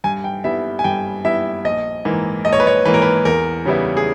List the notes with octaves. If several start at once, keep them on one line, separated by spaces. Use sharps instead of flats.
G2 G#5
G5
G3 B3 E4 E5
G#5
G2 G5
G3 B3 E4 E5
A#1 D#5
G#2 E3 A#3
A#1 D#5
C#5
B4
C#5
G#2 E3 A#3 B4
A#4
B4
E2 A#4
C#3 G3 B3 E4
G#4